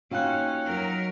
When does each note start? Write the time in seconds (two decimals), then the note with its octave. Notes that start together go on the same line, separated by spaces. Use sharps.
0.11 A#3 C#4 D#4 F4 F#4 G5 F#6
0.66 F#3 A#4